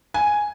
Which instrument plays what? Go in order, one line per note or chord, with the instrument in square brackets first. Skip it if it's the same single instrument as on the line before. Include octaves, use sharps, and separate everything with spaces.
[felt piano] G#5